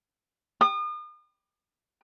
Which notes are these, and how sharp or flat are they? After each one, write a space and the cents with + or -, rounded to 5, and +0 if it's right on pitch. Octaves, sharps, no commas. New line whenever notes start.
D#6 -40